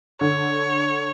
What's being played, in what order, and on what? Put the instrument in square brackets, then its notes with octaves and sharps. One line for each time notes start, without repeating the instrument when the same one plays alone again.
[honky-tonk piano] D3 [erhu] C#5